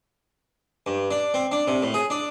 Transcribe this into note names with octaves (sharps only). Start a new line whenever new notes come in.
G2
D4
C4
D4
C3
A2
G#4
D4